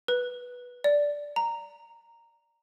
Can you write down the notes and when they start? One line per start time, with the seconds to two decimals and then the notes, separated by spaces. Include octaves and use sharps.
0.08 B4
0.84 D5
1.36 A#5